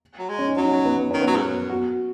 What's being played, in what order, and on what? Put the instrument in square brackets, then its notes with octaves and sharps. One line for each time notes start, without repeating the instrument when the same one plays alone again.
[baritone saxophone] F#3
G#3
[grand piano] C#4
D#4
[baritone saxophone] F#3 [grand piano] C#4
[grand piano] D#4
C#4
B3
B3
[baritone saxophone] D#3 [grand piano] C#4
[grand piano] B3
[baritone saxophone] F#3
G#2
F#2
[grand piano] F#4